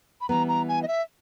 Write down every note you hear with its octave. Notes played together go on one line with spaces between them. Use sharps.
B5
E3 G3 B3 A#5
A#5
G#5
D#5
E5